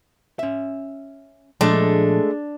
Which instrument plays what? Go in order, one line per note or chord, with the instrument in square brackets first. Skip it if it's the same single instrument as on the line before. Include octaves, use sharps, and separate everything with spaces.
[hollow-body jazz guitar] C#4 E5
[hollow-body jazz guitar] A#2 F3 [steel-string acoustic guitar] G#3 A3 [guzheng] D4